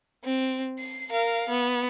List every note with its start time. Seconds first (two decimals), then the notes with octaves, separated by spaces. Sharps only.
0.24 C4
0.79 C7
1.11 A#4 F5
1.49 B3